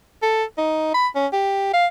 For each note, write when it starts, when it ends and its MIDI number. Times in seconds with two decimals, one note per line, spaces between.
0.22 0.44 69
0.58 0.93 63
0.94 1.07 83
1.15 1.27 61
1.33 1.70 67
1.73 1.87 77